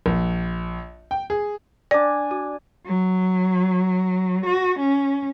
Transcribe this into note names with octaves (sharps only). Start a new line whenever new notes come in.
A#1
G5
G#4
D4 D5 G#5
F#4
F#3
F#4
C#4